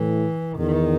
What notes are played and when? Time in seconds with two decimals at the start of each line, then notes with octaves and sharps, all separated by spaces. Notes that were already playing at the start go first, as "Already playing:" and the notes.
Already playing: A2 E3
0.58 E2 D#3